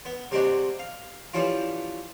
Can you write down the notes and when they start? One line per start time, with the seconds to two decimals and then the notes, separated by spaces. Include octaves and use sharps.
0.05 B3
0.31 C3 G3 G#3 C4 D4 F#4
0.79 F5
1.33 E3 F3 G3 C#4 E4 F4